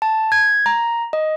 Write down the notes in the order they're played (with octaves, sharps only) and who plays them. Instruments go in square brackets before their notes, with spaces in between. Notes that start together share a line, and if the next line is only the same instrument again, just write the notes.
[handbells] A5
G#6
A#5
D#5